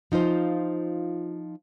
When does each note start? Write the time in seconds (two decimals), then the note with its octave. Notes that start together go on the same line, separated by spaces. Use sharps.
0.12 F3 D#4 F4 C5